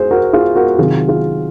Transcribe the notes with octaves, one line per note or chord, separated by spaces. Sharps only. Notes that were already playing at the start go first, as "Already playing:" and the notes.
Already playing: F#4 G#4 C5
F#4 A#4
F4 G#4
F#4 A#4
C3 D#3 F#3 F4 G#4
F4 G#4